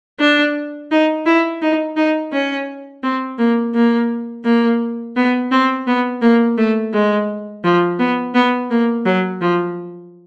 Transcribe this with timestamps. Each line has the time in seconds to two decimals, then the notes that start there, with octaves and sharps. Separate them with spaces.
0.20 D4
0.91 D#4
1.26 E4
1.62 D#4
1.97 D#4
2.33 C#4
3.03 C4
3.38 A#3
3.75 A#3
4.45 A#3
5.17 B3
5.51 C4
5.87 B3
6.22 A#3
6.58 A3
6.93 G#3
7.65 F3
7.99 B3
8.35 B3
8.71 A#3
9.06 F#3
9.41 F3